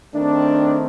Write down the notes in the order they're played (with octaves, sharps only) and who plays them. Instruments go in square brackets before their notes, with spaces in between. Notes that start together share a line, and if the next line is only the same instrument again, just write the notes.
[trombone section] D#3 A3 C4 D4